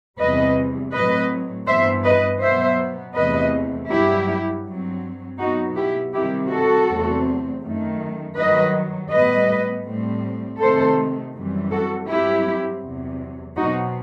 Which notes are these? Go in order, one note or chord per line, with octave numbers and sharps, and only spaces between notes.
E2 C3 E3 G3 B4 D#5
A2 F#3 C4 B4 D#5
G2 E3 B3 C5 E5
B4 D#5
B2 F#3 B3 C5 E5
E2 C3 E3 A3 C4 B4 D#5
G2 F#3 B3 E4 G4
G2 F#3 C4
B2 F#3 B3 D#4 F#4
E4 G4
C3 D#3 G3 C4 E4 G4
F#4 A4
E2 C3 F#3 A3 C4
F#2 D#3 A3
G2 D#3 F#3 B4 D#5
A2 G3 B3 B4 D#5
A2 G3 C4
C3 D#3 A3 C4 A4 C5
F#2 E3 G3 C4
F#4 A4
G2 F#3 C4 E4 G4
E2 C3 F#3
B2 F#3 C4 D#4 F#4